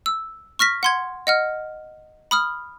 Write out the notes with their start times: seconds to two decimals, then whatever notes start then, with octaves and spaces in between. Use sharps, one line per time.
0.06 E6
0.59 C#6 F6 A#6 B6
0.83 F#5 C6 G#6
1.27 D#5 F#5 F6
2.31 B5 D#6 F6